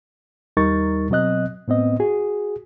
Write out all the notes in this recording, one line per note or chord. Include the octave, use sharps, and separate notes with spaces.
D#2 G3 D#4 A#4 C#6 A6
B2 F#3 C4 D#5 F#6
A2 B3 C4 D#5
F#4 G#4